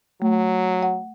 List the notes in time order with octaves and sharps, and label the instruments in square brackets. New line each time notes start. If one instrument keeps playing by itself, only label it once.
[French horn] F#3 [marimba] A3
[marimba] F#5